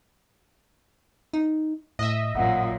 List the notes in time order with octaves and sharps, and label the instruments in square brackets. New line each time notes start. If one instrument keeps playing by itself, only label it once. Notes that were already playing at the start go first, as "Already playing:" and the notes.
[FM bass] D#4
[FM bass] A2 [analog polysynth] D#5 E5
[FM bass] A1 [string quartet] F#2 A#2 [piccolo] F#5